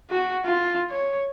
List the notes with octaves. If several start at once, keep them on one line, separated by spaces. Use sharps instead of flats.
F#4
F4
C#5